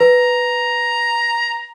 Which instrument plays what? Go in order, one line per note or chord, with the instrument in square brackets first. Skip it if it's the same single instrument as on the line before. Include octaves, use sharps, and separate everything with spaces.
[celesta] B4 [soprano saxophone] A#5